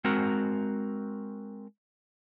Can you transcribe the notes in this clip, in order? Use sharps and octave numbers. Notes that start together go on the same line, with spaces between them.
G#3 C4 F#4 A#4